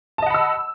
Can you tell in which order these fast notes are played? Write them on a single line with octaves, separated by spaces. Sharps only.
A5 D#5 F#5 B5 E6